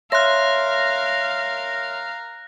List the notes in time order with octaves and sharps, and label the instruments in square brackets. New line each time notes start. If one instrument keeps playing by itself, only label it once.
[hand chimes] C#5 E5 C6 [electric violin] F5 [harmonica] A#5 F6 [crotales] F#6 A#6